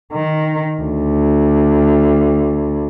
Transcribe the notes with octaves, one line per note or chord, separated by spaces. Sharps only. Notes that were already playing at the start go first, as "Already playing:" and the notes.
D#3
D2